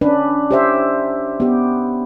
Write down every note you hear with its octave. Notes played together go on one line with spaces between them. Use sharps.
C#4 D4 B4
G4 C5 E5
B3 G4